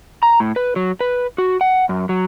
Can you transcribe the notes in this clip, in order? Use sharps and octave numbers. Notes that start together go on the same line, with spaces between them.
A#5
A2
B4
F#3
B4
F#4
F#5
F#2
F#3